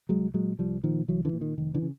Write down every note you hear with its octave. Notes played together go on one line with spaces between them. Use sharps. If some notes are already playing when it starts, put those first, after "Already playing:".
C2 F#3 G#3
A#2 F#3 G#3
C2 F3 G3
A#2 D#3 F3
C2 E3 F#3
D3 E3
A#2
D#3
F1 D#3
D3 E3
C#3